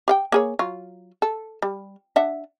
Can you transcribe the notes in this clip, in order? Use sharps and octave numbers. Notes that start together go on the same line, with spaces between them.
G4 F5 G5
A#3 G#4 C#5
F#3 F4
A4
G3
D4 E5 F#5